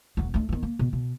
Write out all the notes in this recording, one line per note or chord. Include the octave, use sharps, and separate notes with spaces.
E1 F#3
A3 D4
D#3 B3
A#3
B2
B2